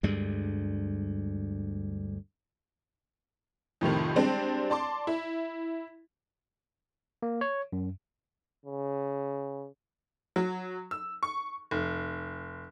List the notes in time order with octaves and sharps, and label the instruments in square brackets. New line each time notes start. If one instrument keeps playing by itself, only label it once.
[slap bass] D2 G2 G3 G#3
[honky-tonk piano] F2 A2 C3 D#3
G3 G#3 C4 D4
D5 A5 C6 D6
E4
[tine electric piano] A#3
C#5
F#2
[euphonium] C#3
[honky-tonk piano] F#3
E6
C#6
F1